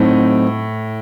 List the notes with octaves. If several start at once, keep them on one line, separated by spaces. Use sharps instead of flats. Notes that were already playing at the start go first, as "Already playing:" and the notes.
Already playing: A2 F#3 A3 C4 D#4